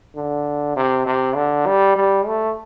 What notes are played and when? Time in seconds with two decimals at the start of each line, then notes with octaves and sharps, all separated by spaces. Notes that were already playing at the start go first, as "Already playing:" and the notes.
0.16 D3
0.76 C3
1.06 C3
1.36 D3
1.66 G3
1.96 G3
2.27 A3